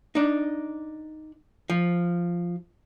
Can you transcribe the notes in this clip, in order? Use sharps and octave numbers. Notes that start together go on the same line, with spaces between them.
D4 D#4
F3